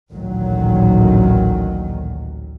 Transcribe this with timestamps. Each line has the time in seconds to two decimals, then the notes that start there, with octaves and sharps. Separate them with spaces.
0.12 A1 D2 A#2 D#3 F#3